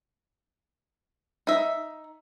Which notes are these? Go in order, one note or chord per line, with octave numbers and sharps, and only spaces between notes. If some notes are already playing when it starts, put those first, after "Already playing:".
D#4 E5